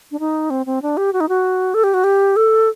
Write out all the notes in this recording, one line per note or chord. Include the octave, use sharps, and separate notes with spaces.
D4
D#4
C4
C4
D4
G4
F#4
D#4
F#4
A4
G4
F#4
G4
A4